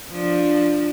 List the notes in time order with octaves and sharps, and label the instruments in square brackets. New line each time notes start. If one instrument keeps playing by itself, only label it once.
[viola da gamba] F3 D4